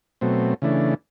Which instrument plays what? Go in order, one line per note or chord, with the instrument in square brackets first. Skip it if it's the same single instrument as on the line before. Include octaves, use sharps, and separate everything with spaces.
[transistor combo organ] B2 F#3 A3 C4
C#3 E3 A3 D4